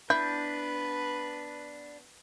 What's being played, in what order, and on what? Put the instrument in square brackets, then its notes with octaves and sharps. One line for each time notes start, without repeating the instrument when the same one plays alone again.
[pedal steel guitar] B3 D4 G6 [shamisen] E4 [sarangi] B4